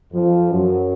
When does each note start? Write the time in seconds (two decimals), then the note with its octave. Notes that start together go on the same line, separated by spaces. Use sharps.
0.12 F2 F3
0.51 F#2 F#3